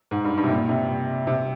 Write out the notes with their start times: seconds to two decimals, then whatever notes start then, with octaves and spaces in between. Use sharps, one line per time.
0.11 G#2
0.25 G2
0.38 G2
0.44 C3
0.49 A#2
0.69 C3
1.27 C3